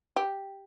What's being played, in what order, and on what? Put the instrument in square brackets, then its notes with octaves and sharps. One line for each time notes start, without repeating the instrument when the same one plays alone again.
[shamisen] G4